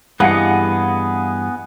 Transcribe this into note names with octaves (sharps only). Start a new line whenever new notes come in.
G2 E3 B3 G#4 D#5 F5 F#5 C#7